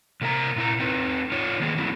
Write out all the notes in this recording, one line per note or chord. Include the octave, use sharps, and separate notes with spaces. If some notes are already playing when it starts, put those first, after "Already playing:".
C3 A#3 A#4 C#5 A#5
A#2 E4 A#5
C4 D#4 B4
D#4 F4 C#5
D#3 A#3 G#4
F#3 C4 E4